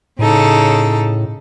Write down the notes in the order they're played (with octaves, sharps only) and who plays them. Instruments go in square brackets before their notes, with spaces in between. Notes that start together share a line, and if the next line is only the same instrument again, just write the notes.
[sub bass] A2 [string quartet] C#3 D#4 A4